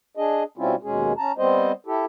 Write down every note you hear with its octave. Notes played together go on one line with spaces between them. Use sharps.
D4 G#4 D#5
B2 G3 C4 C#4 E4 F4
D#2 B2 G#3 C#4 G#4
C#4 A5 A#5
G3 B3 C4 C5 D#5
E4 G4 A4